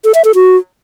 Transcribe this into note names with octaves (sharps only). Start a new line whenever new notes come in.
A4
E5
A4
F#4